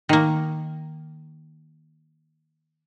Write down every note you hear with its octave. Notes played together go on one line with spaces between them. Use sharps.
D#3 A#3